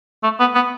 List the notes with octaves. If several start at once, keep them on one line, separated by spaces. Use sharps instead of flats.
A3
B3
B3